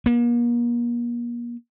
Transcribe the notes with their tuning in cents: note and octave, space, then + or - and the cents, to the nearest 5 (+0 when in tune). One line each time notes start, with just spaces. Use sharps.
A#3 +40